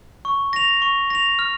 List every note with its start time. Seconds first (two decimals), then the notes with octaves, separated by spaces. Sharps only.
0.25 C#6
0.53 A#6 F7
0.82 C#6
1.10 A#6 F7
1.39 F6